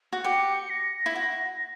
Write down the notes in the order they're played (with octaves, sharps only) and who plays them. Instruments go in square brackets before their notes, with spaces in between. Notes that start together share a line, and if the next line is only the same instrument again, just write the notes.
[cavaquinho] F#4
[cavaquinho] G4 [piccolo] C#7
[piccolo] A#6
[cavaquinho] E4
F#4